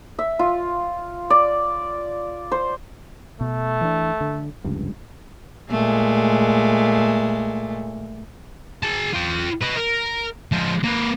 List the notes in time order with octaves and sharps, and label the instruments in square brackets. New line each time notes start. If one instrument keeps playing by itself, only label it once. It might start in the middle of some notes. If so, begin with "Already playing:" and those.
[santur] E5
F4
D5
C5
[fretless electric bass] B2 [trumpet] A3
[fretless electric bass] E3 D4
D3
F1 C#2 G2
[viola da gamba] A#2 G#3 A3
[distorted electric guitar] G#4 A5
F4 G5
B4 D#5
A#4
F3 G#3
A#3 B4